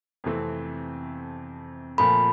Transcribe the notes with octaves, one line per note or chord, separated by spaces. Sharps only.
F2 C3 E3 A3 C4
A#2 F3 A3 B5